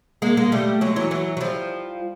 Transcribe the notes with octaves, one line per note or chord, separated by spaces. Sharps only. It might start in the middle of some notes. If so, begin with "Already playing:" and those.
G#3 A#3
G#3 A#3
G3 A3
F#3 G#3
E3 F#3
E3 F#3
F#3
F3 G3